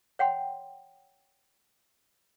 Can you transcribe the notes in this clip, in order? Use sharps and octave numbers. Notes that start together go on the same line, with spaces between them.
C#5 F#5 G5 C6